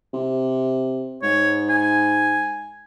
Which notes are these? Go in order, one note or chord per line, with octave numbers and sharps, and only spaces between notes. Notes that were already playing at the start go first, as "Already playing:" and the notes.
C3
G#2 C#5
G#5